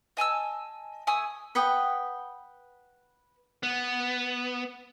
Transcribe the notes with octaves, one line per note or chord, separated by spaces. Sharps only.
D#5 G#5 A5 E6
A3 G#5 D#6 E6
B4 F#5 G5 D#6
B3